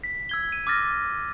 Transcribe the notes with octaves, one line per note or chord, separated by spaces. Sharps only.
B6
E6 G#6 G7
D#7
D6 E6 F6 A6 A#6